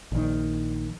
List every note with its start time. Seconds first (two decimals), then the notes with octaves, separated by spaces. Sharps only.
0.12 A#1 D#3